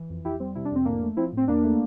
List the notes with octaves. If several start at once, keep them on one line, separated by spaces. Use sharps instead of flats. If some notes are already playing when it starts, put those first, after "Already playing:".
Already playing: E3
F2
F2 E4 G4
G3 C4
C3 E4
D4
F2 C4
A2 A#3 D4
A3
F3 C4 E4
A2 C4
E2 A#3 D4
A3